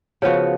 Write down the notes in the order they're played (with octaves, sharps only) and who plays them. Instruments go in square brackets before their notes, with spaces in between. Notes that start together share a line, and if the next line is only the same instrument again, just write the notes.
[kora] C#3 F3 B3 F#4